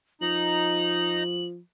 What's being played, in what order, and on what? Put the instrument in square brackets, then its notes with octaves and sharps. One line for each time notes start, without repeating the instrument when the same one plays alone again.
[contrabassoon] F3 [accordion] D#4 A#5 [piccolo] F#7